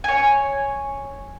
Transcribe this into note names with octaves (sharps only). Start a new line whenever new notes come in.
C#5 G#5